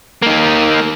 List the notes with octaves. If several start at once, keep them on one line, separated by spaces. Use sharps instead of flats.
A#3 D#4